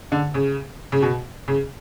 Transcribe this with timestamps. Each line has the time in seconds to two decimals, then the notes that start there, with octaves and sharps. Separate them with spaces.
0.12 D3
0.34 C#3
0.92 C#3
1.02 B2
1.48 C#3